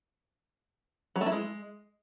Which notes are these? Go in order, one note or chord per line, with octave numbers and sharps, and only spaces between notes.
F#3
A3
E4
G#3